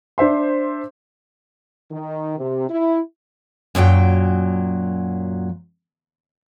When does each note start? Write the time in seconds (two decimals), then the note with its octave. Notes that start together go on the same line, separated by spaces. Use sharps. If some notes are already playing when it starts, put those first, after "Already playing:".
0.18 D4 C5 E5 C6
1.91 D#3
2.38 C3
2.68 E4
3.75 F#2 A#2 F#3 G5